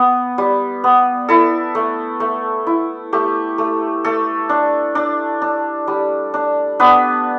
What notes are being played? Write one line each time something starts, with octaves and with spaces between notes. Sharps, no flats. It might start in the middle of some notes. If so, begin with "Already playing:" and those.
Already playing: B3
G3
B3
E4 A4
A3
A3
E4
A3 G4
A3
A3 A4
D4
D4
D4
G3
D4
B3 D4 B4